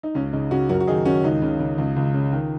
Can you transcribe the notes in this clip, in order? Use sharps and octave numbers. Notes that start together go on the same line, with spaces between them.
D#4
C#2 C#4
C#3 D#4
C#3 C#4 F#4
F#2 F#4 A#4
F#4
D#3 D#4 G#4
D#3 C#4 F#4
C#2 D#4
C#3
C#3
C#2
C#2
C#3
D#3